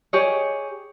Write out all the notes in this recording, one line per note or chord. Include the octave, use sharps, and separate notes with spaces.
G4 G#4 C#5 D#5